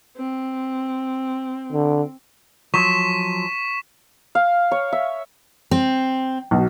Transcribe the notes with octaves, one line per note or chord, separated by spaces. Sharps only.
C4
D3
F3 F#3 C#6 B6 E7
F5
C#5
E5
C4
B1 F#3